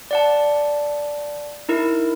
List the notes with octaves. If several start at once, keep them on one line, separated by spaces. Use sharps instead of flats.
D5 F#5 A5
D#4 E4 A#4